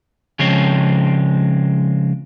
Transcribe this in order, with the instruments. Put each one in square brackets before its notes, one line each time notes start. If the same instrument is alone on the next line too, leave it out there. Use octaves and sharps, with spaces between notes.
[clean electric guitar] C#3 F3 G#3 C4 C5 C#5